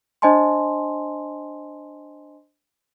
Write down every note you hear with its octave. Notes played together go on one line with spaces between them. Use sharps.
D4 C5 D#5 G#5 A5 C6